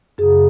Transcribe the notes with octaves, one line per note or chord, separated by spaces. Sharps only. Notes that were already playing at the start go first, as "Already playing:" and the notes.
F#2 C#3 G#4